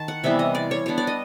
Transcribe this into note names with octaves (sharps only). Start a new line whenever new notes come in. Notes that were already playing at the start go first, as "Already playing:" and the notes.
Already playing: D#3 A5
F#5
C3 E3 G3 B3 E5
D#5
D5
C#5
G3 B3 D4 C#5
D5
D#5